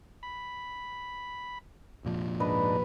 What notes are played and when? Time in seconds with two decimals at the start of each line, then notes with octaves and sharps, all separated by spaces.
0.23 B5
2.04 F1 A#2 F3
2.40 G#2 D4 D#4 B4